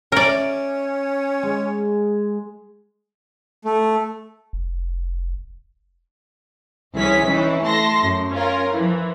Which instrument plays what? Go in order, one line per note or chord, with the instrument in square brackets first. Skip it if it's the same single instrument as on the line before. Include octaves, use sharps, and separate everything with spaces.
[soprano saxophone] C#4 [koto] A#4 D5 [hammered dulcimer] E5
[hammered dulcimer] G#3
[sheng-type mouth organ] A3
[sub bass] F1
[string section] C2 E3 C#4 G#4 B6
E3 C#4 D#4 E4
A3 A5 C6 A#6
F#2
C#4 F4 A#4
E3 F3